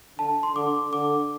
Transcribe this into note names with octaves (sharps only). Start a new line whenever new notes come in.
D3 A5
C6
D3 D6
D3 D6